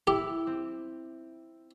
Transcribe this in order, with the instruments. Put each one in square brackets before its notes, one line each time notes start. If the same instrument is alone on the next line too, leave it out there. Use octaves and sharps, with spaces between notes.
[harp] E4 [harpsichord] G4
[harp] C4